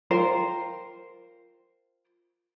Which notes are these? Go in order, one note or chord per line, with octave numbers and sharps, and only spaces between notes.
F4 A#4 C5 G5